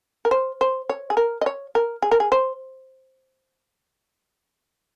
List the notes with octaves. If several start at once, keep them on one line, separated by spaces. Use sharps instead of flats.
A#4
C5
C5
C#5
G#4
A#4
D#5
C#5
A#4
G#4
A#4
G#4
C5